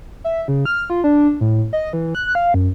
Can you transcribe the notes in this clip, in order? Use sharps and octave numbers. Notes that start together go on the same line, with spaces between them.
E5
C#3
F6
F4
D4
A2
D#5
E3
F#6
F5
F#2